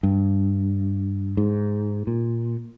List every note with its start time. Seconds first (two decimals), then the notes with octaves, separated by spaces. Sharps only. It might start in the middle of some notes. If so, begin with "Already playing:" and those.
0.03 G2
1.37 G#2
2.07 A#2